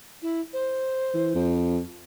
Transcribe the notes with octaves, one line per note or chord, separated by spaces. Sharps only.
E4
C5
E3
F2